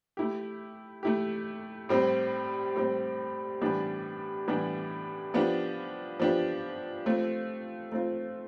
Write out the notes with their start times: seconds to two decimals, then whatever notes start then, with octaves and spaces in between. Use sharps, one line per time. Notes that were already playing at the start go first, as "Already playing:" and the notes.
0.17 A3 E4 G4
1.03 A3 E4 G4
1.89 A2 G3 C4
2.76 A2 G3 C4
3.61 A2 E3 G3 B3 D4
4.48 A2 E3 G3 B3 D4
5.34 F3 B3 D4 G4
6.20 F3 B3 D4 G4
7.06 A3 C4 F4
7.92 A3 C4 F4